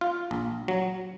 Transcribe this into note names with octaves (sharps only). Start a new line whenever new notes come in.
F4
A#1
F#3